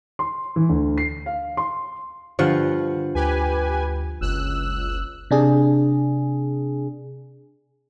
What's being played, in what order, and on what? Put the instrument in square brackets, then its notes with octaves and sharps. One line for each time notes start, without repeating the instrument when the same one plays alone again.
[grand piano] C6
E3
D2
C7
F5
C6
[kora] G2 F3 F#5 [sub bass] D3
[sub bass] D2 [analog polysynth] G4 B4 G#5
[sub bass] F#1 [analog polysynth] C#2 E6 F#6
[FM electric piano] C3 D4 G#4